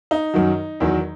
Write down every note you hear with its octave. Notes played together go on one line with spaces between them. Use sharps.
D#4
F#2 D#3 F#3
E2 D#3 F#3